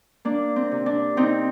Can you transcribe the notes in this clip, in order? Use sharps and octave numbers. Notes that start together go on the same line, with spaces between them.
A#3 D4
C4
C3
D4
C3 C4 D#4